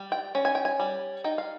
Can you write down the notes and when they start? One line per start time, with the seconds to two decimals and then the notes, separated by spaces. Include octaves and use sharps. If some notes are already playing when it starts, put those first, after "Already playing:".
Already playing: G3
0.12 G5
0.35 C#4
0.45 G#5
0.55 G5
0.65 G#5
0.80 G3
1.24 D#4 G5
1.38 F5